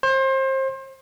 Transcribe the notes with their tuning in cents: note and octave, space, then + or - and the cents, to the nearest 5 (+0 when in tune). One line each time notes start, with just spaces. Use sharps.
C5 +30